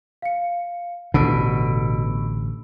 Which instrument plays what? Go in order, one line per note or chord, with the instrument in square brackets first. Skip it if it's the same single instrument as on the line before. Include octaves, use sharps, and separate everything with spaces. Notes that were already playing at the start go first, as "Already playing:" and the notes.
[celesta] F5 C#7
[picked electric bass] A1 D3 [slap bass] B2 [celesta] B5 E6 D7